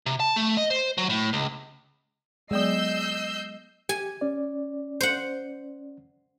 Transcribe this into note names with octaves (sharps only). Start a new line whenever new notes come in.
C3
A5
A3
D#5
C5
F#3
A2
C#2
F#3 G#3 B3 D5 D#5 E6 G6 C7
G4 G#5
C#4 D5
C5 F#5